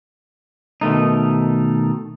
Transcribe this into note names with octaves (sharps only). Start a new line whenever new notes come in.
B2 D#3 A3 D#4